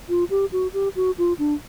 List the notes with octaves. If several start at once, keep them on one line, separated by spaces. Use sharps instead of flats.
F4
G4
F#4
G4
F#4
F4
D4